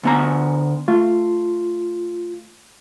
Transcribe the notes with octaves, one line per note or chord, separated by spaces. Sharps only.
D2 B3 A#5
A3 F4